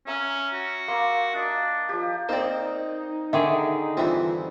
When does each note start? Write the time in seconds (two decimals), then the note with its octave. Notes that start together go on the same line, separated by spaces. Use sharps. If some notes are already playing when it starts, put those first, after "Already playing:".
0.07 C#4 E5 A#5 E6
0.53 F#4
0.88 A#3 C6 E6
1.35 D4 D#5
1.89 F3 G4
2.29 A#3 C4 D#4 C5 D5
3.33 D3 D#3 G#4 E5
3.97 G2 E3 C4 F4 E5